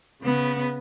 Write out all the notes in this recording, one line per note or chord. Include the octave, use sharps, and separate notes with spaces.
C#3 B3